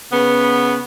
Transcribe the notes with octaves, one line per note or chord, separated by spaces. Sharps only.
C#3 B3